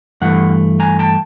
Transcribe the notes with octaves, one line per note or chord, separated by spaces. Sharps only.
G2 E3 A3 F#5
G#5 A#5
G5 A5